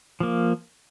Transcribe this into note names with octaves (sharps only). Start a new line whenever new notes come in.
F3 A#3